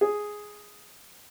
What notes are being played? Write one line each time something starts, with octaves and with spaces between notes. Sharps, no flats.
G#4